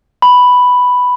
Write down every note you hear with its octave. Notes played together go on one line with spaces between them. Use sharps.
B5